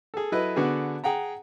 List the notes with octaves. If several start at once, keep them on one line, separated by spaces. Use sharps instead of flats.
G#4 A4
F#3 E4 A4 B4 D#5
D3 B3 D4 F#4 G#4
G#4 F#5 G5 A#5